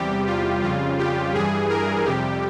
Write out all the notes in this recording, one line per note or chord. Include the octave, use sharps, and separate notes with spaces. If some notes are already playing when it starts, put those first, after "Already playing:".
Already playing: E2 C3 G3 G4
F4
F2 C#3 G3 F4
G4
G2 E3 G3 G#4
A#4
F2 C3 G3 G4